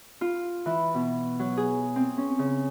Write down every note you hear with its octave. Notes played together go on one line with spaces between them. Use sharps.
F4
E3
B2
F#3
G#4
C4
C#4
C#3